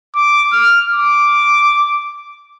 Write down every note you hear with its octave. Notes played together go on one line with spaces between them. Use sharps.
D6
F6
D6